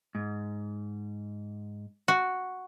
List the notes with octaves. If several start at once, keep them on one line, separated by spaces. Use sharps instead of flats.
G#2
F#4